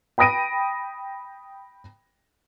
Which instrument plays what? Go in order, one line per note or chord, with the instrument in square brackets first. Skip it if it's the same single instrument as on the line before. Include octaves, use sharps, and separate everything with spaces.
[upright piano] G5 B5 D#6 A#6 D7 D#7